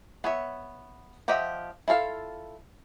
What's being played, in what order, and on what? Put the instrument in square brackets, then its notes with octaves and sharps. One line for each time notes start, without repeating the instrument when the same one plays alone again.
[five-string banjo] B3 C#5 E5
F3 G4 D#5 E5 F#5
E4 F4 A4 F5